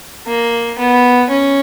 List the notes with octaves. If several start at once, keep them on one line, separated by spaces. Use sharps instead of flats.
A#3
B3
C#4